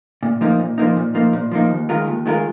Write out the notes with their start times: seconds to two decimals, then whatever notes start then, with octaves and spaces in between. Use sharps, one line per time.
0.23 A#2
0.41 F3 A#3 D#4
0.60 A#2
0.78 F3 A#3 D#4
0.96 A#2
1.14 F3 A#3 D#4
1.33 A#2
1.51 F3 A#3 D#4
1.70 D#2
1.89 D#3 G#3 F4 A#4
2.07 D#2
2.26 D#3 G#3 F4 A#4